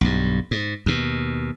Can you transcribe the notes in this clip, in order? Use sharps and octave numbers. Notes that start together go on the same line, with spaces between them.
B1 G2
G#2
D#2 B2